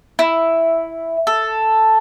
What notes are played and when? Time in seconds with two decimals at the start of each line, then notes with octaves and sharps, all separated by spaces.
0.19 E4
1.27 A4